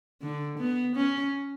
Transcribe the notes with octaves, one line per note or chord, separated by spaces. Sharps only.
D3
B3
C#4